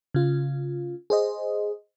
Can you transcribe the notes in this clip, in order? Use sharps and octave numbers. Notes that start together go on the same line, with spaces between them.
C#3 F4
G#4 C5 D#5